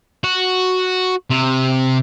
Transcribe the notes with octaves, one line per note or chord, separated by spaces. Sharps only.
F#4
C3